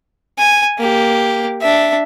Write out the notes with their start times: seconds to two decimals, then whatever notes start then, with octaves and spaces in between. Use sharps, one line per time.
0.38 G#5
0.79 A#3 G4
1.62 D4 E5